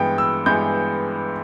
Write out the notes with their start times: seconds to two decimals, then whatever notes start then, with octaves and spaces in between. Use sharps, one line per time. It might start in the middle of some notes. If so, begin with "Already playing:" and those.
Already playing: G2 E3 G#3 B3 G5
0.18 E6
0.46 G2 E3 G#3 B3 G6